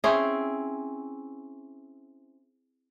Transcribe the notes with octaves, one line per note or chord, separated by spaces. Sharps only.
C4 C#4 E4 G#4